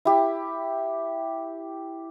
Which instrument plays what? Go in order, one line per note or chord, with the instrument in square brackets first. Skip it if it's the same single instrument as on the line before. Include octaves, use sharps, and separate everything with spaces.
[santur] E4 G4